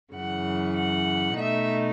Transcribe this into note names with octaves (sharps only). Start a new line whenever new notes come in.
F#2 C#3 E3 F#5
F#5
B2 A3 D#4 E5